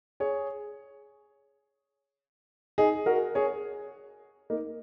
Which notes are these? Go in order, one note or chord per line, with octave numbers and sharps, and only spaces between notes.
G#4 C#5
D#4 G#4
F#4 A#4
G#4 C#5
A#3 D#4